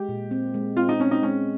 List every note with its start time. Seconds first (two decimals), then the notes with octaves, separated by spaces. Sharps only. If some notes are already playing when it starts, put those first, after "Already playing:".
Already playing: G#3 G4
0.09 A#2
0.31 C4
0.54 G#3
0.76 C4 F4
0.89 D#4
1.00 C4 C#4
1.11 D#4
1.22 G#3 C#4